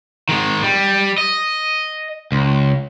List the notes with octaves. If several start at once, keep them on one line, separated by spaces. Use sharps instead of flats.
D#3 G#3
G3
D#5
C#2